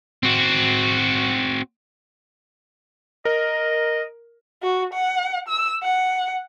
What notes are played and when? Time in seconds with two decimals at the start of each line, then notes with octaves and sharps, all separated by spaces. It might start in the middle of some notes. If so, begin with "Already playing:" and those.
0.23 C4 F#4
3.25 A#4 D#5
4.62 F#4
4.93 F#5
5.48 E6
5.82 F#5